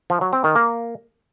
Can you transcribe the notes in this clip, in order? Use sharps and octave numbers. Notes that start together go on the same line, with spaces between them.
F3
F#3
C4
D#3
A#3